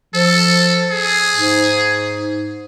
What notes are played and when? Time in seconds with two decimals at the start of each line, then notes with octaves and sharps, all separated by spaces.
0.15 F3 A4
0.91 G#4
1.36 G#2